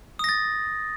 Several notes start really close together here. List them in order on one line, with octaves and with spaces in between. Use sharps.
D#6 A#6 A6